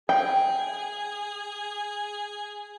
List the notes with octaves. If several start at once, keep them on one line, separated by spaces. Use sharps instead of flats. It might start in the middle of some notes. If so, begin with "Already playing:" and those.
G#4 G5